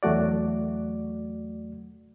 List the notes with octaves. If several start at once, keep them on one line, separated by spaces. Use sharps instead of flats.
E2 F#3 A3 F#4 D5